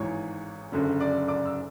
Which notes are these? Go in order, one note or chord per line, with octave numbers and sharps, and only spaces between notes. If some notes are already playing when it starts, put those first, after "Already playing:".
Already playing: G#1 G#2 E3 G#3 C#5 C#6
F#1 F#2 D3
D5 D6
D5 D6
E6